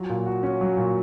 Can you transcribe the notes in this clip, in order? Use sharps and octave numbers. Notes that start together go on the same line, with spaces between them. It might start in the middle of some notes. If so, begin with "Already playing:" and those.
Already playing: F#3 F4
A#2
F#4
C#4
F#3
A#2